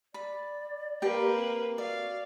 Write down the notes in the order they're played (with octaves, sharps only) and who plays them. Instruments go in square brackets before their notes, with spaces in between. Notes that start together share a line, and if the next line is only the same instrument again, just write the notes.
[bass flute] D5 [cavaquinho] B5
[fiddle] A#3 B4 [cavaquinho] G4 G5
[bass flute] C4
[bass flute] F#4 [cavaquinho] D5 [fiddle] F5